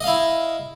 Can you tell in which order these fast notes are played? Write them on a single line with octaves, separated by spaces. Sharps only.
D#5 F5 E4